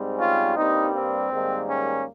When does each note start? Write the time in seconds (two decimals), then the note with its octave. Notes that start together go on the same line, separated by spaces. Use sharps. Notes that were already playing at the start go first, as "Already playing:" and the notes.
Already playing: G#2 G3 C4
0.18 C#4 F4
0.56 G2 G3 A#3 C4 D#4
0.94 C4
1.32 G#2 D#3 G3 A#3
1.69 C#4